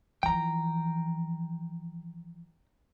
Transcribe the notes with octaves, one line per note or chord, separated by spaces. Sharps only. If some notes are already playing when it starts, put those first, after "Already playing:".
E3 F3 G5 A#5